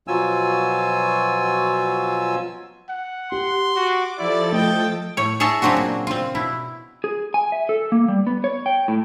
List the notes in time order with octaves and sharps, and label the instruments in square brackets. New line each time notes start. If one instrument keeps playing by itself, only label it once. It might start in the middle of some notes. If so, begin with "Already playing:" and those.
[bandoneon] B2 F3 F#3 F4 G#5 E6
[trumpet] F#5
[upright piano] G4 [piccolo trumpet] C6
[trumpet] F#4 [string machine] D6
[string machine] F3 A4 A6 [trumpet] E4 [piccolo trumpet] D5
[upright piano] A3 [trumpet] D#5 [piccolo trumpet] G5
[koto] A2 C#5
G#4 C#5 D#5 E5 A5
C#3 F#3 C4 D4 F#4
A#2
C4 F4
B2 E4
[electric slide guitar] G#4
G#5
E5
A4
A#3
G3
B3
C#5
G5
A2